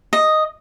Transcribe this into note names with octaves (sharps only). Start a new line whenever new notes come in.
D#5